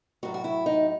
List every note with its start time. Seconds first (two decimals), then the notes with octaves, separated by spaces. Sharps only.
0.23 A2 F#3 F#4
0.34 F#4
0.44 E4
0.66 D#4